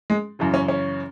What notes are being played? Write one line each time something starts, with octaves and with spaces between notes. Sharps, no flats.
G#3
F#2 C#3 E3
C#4
C#4